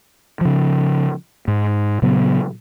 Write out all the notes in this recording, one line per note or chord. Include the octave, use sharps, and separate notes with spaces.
C#3 F3
G#2
A#2 C#3 F#3 B3